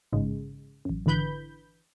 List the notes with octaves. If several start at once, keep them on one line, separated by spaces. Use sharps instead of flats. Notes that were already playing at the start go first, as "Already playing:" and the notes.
A1 G#2 C#3 G#3
A1 F#2
G#1 D3 E3 B4 B5 G6